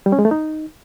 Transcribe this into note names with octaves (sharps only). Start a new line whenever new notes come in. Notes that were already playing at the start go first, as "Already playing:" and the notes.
G3
C#4
G#3
A3
D#4